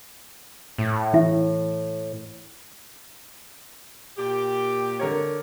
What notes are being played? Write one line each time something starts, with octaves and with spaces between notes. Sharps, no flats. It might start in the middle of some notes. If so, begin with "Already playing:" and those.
A2
E3 E4
A#2 G4
D3 A#4 C#5